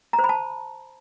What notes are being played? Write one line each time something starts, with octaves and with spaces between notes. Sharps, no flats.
A#5
C5
B5
A5